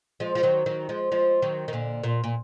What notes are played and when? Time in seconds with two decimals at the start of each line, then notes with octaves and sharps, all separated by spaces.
0.20 F3 G#3
0.35 F3
0.43 D#3 F#3
0.66 D#3 F#3
0.89 F3 G#3
1.12 F3 G#3
1.42 D#3 F#3
1.68 D#3
1.73 A#2 D3
2.03 A#2
2.24 A#2